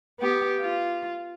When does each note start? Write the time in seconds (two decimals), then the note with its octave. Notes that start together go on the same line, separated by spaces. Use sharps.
0.20 B3 G4
0.60 F4